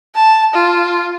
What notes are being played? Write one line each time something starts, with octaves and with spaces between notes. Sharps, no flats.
A5
F4